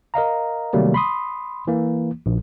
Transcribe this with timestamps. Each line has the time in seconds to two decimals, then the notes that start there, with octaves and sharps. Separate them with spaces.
0.14 A#4 D#5 F5 A#5
0.73 C3 D#3 F#3 G3 A3 A#3
0.94 B5 C6 D#6
1.67 E3 A#3
2.26 A#1